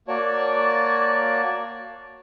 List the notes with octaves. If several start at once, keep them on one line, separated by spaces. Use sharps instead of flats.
A#3 F#4 C#5 D5 A5